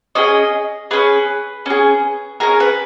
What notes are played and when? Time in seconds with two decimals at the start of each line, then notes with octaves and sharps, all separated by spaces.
0.15 C#4 G#4 D#5
0.91 C#4 G#4 B4
1.66 C#4 G#4
2.40 C#4 G#4 A#4
2.60 B4